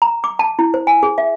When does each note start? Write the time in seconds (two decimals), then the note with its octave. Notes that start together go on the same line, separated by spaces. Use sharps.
0.02 A#5
0.24 D6
0.39 A5
0.59 E4
0.74 C5
0.87 G#5
1.03 G#4
1.18 E5